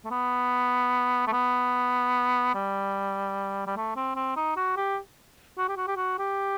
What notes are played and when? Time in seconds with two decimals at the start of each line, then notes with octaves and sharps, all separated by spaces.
0.05 A3
0.11 B3
1.27 A3
1.33 B3
2.55 G3
3.67 G3
3.76 A3
3.96 C4
4.16 C4
4.36 D#4
4.56 F#4
4.77 G4
5.58 F#4
5.68 G4
5.77 F#4
5.87 G4
5.96 F#4
6.19 G4